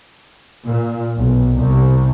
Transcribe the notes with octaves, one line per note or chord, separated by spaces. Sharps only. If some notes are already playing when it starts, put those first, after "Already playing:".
A#2
B1
C2